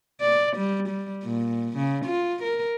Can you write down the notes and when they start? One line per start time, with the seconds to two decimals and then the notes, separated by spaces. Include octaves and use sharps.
0.21 D5
0.57 G3
0.89 G3
1.25 A#2
1.77 C#3
2.05 F4
2.43 A#4